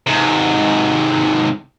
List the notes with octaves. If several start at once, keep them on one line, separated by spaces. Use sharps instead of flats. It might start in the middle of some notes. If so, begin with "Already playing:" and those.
G#2 C3